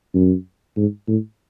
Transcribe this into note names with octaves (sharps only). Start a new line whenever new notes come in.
F#2
G#2
A2